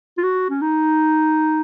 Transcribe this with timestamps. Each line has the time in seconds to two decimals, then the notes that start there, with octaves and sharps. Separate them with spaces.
0.18 F4
0.23 F#4
0.50 C#4
0.62 D#4